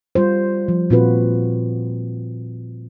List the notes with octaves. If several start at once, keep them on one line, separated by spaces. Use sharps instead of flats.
G3 F4 C5
F3
A#2 C4 F4 F#4 B4